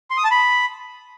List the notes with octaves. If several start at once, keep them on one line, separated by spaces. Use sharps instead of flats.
C6
D#6
A5
B5